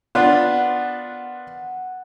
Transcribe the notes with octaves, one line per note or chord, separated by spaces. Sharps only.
B3 D4 F4 F#5